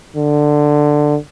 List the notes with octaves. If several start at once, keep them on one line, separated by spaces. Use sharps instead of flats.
D3